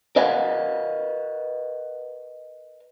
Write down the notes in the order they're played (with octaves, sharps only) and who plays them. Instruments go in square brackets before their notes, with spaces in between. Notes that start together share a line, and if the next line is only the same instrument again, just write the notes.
[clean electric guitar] A#4 B4 D#5 F5 F#5 G#5